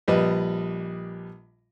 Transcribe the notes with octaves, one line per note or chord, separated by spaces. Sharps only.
A#1 G3 B4 D#5